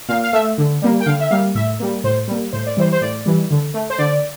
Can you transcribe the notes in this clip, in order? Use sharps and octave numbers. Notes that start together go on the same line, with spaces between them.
A#2 F5
F5
A3 E5
D3
G3 A#3
G5
D3 F5
E5
G3 A#3 F5
A2 E5
G3 A#3
A2 C5
G3 A#3
A2 C5
D5
E3 G3 C5
C5
A2 D5
E3 G3
D3
A3
C5
D3 D5